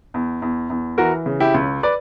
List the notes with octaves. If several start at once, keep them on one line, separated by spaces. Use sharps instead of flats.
E2
E2
E2
E3 F#4 A#4
C#3
E4 G4
C#2
B4 D5